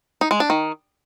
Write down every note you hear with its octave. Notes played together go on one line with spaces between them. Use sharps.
D#4
G#3
D4
D#3